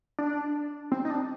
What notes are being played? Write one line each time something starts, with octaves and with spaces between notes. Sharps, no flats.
D4
C4
D#4
D4